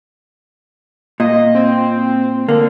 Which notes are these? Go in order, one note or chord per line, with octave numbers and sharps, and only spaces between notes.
A#2 D#5
C4
D3 A#3